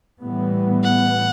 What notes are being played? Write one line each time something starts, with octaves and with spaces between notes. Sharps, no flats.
A2 E3 G3 B3
F#5